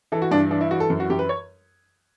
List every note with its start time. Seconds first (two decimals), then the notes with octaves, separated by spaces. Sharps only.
0.12 E3 A4
0.22 F#4
0.31 G2 D4
0.51 E3 D4
0.61 E4
0.71 E3 F#4
0.80 A4
0.90 F#2
1.00 F#4
1.10 F#2 G4
1.19 B4
1.29 C#5